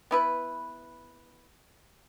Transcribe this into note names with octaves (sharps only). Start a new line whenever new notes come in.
B3 E4 B4